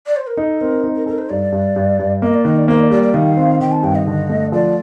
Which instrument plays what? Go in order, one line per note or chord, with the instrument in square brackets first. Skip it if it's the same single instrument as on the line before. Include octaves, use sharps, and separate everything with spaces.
[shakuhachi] D5
C5
A#4
[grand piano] D#4 [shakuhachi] A4
[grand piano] C4 [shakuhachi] A#4
[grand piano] D#4
[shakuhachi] A#4
[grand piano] A4 [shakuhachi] A#4
[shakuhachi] C5
[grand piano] G2 [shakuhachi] D5
[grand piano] G2
G2
G2
[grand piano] A#3 [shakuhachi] D#5
[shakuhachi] D5
[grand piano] D#3 [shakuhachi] D#5
[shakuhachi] D5
[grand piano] A#3 [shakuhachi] C5
[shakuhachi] D5
[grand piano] G3 [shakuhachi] D5
[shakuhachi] D5
[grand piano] D#3 [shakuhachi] F5
[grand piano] C4
[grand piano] D#3 [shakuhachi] G5
[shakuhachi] A5
[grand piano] G2 [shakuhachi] G5
[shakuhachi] D#5
[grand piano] D3
A3
[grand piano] F3 [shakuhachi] D5